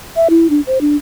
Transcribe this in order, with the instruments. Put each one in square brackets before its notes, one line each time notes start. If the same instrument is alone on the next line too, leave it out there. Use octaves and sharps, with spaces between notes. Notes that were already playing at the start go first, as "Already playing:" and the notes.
[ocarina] E5
E4
D4
C5
D4